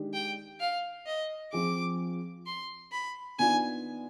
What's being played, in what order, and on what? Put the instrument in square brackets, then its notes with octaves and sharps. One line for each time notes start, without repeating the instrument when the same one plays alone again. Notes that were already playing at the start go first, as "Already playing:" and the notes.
Already playing: [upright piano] D#3 G#3 D4 G4
[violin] G5
F5
D#5
[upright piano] F3 C4 F4 G#4 [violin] D6
[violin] C6
B5
[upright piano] D#3 B3 D4 F4 [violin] G#5